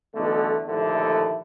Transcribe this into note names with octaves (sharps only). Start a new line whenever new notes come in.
B1 E2 D3 A3
A#1 D#2 D3 A3 E4